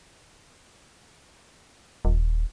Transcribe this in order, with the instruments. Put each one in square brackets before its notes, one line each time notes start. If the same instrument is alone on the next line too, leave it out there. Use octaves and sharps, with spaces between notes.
[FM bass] D#1